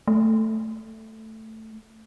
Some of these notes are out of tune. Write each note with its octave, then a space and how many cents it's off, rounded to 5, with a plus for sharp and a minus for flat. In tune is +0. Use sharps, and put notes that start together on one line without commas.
A3 +5